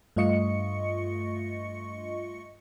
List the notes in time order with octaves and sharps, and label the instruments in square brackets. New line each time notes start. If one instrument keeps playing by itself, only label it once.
[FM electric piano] G2 A3 F4 D#5 C#6 C#7